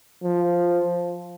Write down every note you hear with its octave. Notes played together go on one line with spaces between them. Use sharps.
F3